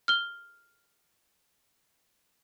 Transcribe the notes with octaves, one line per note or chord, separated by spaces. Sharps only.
F6 G7